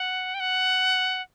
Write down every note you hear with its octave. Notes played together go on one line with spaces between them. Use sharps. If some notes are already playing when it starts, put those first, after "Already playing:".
Already playing: F#5
G5
F#5